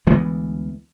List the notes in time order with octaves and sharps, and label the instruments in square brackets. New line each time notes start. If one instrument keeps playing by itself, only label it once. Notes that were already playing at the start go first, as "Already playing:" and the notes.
[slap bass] D2 E3 G#3 B3